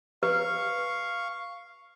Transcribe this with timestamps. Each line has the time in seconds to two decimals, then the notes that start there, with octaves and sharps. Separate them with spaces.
0.23 B4 F5 C#6